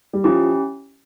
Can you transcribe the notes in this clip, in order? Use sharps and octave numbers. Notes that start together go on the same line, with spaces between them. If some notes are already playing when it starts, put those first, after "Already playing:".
G3
F3 C#4 E4 G4